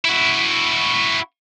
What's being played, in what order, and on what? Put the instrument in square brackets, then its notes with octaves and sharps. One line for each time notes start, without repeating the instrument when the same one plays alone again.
[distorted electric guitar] E4 F#4